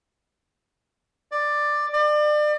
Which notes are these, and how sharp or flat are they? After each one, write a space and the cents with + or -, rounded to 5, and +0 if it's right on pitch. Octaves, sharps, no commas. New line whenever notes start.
D5 +10
D5 +35